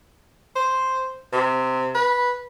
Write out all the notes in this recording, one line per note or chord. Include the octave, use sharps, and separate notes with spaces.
C5
C3
B4